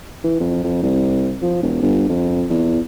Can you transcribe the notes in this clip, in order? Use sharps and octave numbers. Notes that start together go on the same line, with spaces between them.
E3
F2
F2
C2
F3
E1
G1
F2
E2